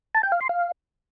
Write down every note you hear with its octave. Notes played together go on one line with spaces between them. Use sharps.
A5
G5
F5
C6
F5